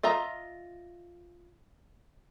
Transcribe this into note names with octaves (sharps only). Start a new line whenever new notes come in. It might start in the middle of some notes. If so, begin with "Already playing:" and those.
F4 D#5 E5 A#5